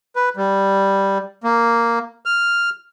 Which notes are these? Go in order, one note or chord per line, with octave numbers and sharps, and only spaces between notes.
B4
G3
A#3
F6